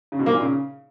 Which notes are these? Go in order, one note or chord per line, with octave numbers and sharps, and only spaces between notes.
C#3
B2
A#3
A#2
C#3